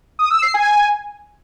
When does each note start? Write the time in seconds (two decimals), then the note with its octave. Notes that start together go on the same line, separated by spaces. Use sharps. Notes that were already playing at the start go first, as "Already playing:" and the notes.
0.19 D#6
0.31 E6
0.42 C7
0.54 G#5